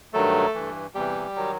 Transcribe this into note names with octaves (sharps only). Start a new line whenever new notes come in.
G2 D#3 F#3 A3 A4
G2 E3
E2 C3 E3 G3 G4
D#3 F#3